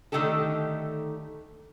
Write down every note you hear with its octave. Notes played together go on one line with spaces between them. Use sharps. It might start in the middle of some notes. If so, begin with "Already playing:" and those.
D3 D#3 A3 D#4 G4 A4